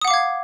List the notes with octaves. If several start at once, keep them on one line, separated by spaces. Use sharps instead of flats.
F5 F#5 D6 D#6 G#6